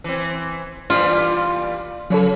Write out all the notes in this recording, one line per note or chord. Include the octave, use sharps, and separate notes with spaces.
E3 C4
A#2 E3 G3 F4
C#3 F#3 A4 C#5